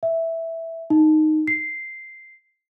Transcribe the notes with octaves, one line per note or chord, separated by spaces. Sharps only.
E5
D#4
C7